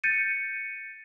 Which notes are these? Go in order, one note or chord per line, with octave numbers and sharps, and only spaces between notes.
G6 A6 C#7 D#7